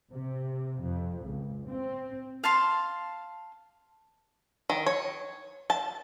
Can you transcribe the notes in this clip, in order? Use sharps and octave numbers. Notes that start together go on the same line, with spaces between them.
C3
F2
C#2
C4
F5 A5 C6
D#3
C#5
A5